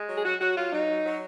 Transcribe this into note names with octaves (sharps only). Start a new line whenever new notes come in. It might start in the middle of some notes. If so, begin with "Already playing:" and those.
Already playing: G#3
F#3
G#4
F#3 F#4
F#3 F#4
F#3 F4
F#3 D#4
F#3
F#3